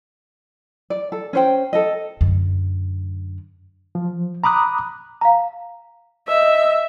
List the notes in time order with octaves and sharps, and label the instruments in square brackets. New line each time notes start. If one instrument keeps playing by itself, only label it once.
[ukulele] D5
A4
C#4 C5 G5
A4 D#5
[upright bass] F#2 D3
[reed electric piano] F3
A#5 B5 D6 D#6 F#6
[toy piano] F5 A#5
[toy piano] A#4 [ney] D#5 [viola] E5